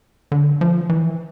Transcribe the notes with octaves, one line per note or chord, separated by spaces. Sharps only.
D3
F3
E3